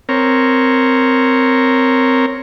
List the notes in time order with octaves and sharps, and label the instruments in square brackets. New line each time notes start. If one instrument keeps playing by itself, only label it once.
[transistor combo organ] C4 A#4 C#5